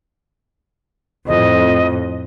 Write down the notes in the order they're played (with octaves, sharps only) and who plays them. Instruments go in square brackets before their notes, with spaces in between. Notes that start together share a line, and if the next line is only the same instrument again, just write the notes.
[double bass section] F2 A2 [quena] D#5